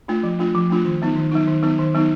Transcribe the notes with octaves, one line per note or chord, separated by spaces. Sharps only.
A3 D4 F4
F3
A3 D4 F4
F3
A3 D4 F4
D#3
F#3 B3 D#4
D#3
F#3 B3 D#4
D#3
F#3 B3 D#4
D#3
F#3 B3 D#4